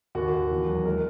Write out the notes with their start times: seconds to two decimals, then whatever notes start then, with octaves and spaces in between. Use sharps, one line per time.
0.15 D#2 F#4
0.33 D#2
0.51 E2
0.68 F#3
0.85 G#3 A#4